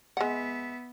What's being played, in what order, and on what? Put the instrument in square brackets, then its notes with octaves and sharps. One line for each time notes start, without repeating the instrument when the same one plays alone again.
[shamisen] G#3 F#5 [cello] B3 E5